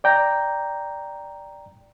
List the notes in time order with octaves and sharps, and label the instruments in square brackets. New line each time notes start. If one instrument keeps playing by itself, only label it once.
[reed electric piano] D5 G5 A#5